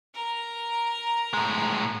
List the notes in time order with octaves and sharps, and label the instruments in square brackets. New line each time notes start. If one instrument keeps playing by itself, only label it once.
[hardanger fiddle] A#4 A#5
[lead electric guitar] A2 G#3